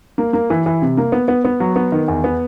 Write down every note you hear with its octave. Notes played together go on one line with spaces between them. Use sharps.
A#3
A#3
E3
E3
C3
A#3
B3
B3
B3
F#3
B3
D#3
E2
B3